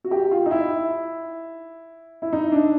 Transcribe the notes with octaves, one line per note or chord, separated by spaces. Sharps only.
F#4
G4
F4
D#4
E4
E4
D#4
D4